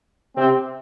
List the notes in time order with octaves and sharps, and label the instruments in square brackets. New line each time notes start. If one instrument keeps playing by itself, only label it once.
[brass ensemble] C3 C4